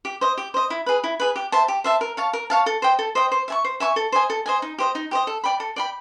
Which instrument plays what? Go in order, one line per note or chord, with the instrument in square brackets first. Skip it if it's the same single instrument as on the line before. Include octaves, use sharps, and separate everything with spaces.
[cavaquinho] G4
C5 D#5
G4
C5 D#5
E4
G#4 B4
E4
G#4 B4
G4
C5 E5 A5
G4
C5 E5 A5
A#4
C#5 F5 A5
A#4
C#5 F5 A5
A4
C5 D#5 G5
A4
C5 D#5 G5
C5
E5 G#5 C#6
C5
E5 G#5 C#6
A4
C5 D#5 G#5
A4
C5 D#5 G#5
D#4
G4 C5 D#5
D#4
G4 C5 D#5
A4
D5 G5 B5
A4
D5 G5 B5